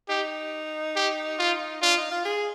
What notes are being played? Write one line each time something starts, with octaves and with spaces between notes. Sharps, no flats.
D#4 G4
G4
F4
D4 F4
D#4
F4
G#4